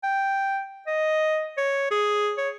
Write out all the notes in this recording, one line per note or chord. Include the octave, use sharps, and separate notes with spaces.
G5
D#5
C#5
G#4
C#5